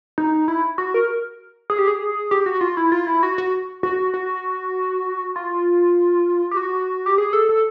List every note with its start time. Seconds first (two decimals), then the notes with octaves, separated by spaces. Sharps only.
0.18 D#4
0.48 E4
0.78 F#4
0.94 A#4
1.70 G#4
1.79 G4
1.88 G#4
2.31 G4
2.46 F#4
2.61 F4
2.77 E4
2.92 F4
3.07 E4
3.23 F#4
3.38 F#4
3.83 F#4
4.14 F#4
5.36 F4
6.51 G4
6.57 F#4
7.06 G4
7.18 G#4
7.33 A4
7.49 A4